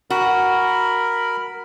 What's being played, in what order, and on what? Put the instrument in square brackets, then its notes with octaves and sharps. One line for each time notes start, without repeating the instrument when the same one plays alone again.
[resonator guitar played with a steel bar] F#4 [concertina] A#4 B5